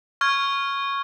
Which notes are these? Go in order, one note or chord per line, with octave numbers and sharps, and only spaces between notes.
C#6 F6 G#6